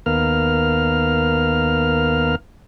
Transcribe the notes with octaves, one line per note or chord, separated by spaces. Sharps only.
D#2 B3 A#4 F5 F6